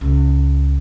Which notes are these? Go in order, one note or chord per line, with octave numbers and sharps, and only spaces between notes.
C#2